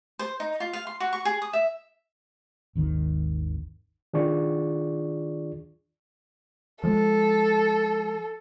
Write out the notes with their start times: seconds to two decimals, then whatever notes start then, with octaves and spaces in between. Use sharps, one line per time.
0.19 C5
0.40 D#4
0.60 F4
0.73 F5
0.87 C6
1.00 F#4
1.13 C#6
1.25 G#4
1.42 D#6
1.53 E5
2.75 G#1 D#2 D#3
4.14 D#3 D4 F4 G#4 D5 C#6
6.83 F3 G#3 A4